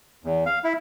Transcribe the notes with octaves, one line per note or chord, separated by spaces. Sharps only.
E2
F5
E4